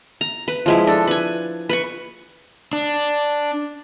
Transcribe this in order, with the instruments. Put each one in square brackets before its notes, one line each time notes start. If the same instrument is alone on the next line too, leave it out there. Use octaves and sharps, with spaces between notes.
[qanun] A#5
B4
F3 G#3 E4
D4 A4
B4 G#5
B4 B5 C#6
[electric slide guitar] D4